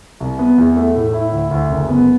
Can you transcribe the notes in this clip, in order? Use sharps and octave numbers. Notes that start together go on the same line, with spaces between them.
C2
B3
E2
A3
A2
E4
D2
D2
F#1
B3